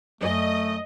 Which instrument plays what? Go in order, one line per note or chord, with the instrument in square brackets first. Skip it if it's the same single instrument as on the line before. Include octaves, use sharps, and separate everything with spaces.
[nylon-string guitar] F#2 D5 G#5 [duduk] A3 [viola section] D#5